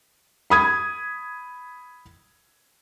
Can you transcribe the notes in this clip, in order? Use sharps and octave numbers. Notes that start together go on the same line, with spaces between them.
B5 D#6 G#6